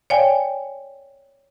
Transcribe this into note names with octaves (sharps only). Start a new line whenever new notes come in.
C#5 D5 F5 G5 G#5